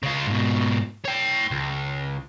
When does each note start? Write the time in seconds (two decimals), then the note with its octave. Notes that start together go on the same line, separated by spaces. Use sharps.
0.03 C#3 F4
0.27 G#2 B2
1.05 C#5 G5
1.51 C#2